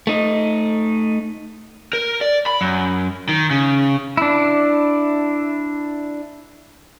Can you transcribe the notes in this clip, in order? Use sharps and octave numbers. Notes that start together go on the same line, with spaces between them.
A3 D#4
A#4
D5
B5
F#2
D#3
C#3
D4 E4